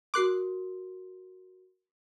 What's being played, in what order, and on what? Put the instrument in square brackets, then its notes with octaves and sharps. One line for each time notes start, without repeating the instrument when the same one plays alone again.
[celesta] F#4 A#4 C6 [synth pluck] D6 F#6 C7